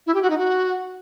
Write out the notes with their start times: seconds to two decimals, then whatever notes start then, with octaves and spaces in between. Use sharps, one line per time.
0.07 E4
0.14 G4
0.22 F#4
0.30 D#4
0.38 F#4